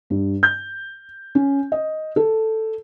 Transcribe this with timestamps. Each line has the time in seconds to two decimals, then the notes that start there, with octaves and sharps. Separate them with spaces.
0.10 G2
0.43 G6
1.35 C#4
1.72 D#5
2.16 A4